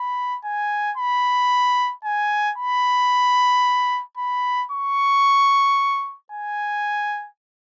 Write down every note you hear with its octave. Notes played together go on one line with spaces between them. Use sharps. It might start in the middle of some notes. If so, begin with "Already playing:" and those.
Already playing: B5
G#5
B5
G#5
B5
B5
C#6
G#5